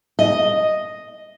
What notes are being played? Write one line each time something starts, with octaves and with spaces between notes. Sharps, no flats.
D#5